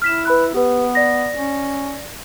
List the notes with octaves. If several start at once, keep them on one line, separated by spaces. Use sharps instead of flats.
E4 F6 B6 E7
B4 B5 F#6
B3 G4 B4
D5 A#6
C#4